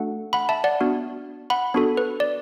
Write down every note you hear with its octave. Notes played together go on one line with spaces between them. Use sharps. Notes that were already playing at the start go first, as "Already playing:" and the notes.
Already playing: A3 D4 F#4 A4 F#5
F#5 B5
E5 A5
D5 F#5
B3 D4 F#4
F#5 B5
B3 D4 F#4 A4
B4
D5